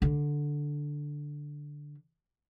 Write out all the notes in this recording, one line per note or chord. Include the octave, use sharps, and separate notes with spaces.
D3 D4